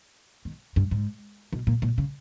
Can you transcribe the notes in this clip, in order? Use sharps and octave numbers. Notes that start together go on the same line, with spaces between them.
D#3
G2
G#2
B2
A#2
A#2
C#3